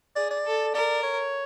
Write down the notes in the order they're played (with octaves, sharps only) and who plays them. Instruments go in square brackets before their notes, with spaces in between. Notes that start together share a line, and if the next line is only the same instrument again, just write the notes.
[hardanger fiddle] G#4 [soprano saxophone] D5
[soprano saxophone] D5
[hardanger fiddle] A4
[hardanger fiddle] A#4 [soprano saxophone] D5
[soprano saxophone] C#5